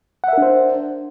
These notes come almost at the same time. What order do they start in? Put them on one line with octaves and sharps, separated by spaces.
F#5 E5 A#4 D4 C5